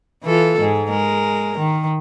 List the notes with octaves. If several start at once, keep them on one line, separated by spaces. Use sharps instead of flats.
E3 F4 A4
G#2 G#3
G#3 A#4
D#3